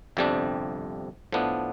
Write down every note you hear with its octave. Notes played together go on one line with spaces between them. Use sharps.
G1 F2 C3 G3 D4
A2 F3 B3 D4